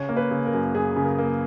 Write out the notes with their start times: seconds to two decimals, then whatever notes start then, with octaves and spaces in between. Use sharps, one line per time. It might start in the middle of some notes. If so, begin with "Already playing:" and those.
Already playing: C#3 C#5
0.09 A#3
0.17 B4
0.31 C#3
0.46 A#4
0.54 F#2
0.75 F#2 G#4
0.96 C#3
1.04 A#4
1.18 A#3